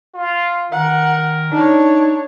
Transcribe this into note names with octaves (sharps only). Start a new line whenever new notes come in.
F4
D#3 A#4 F#5
D4 D#4 C#5